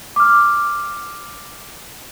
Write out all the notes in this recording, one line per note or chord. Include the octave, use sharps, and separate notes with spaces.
D6 F6